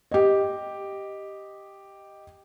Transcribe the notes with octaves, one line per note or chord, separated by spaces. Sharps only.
G4 D#5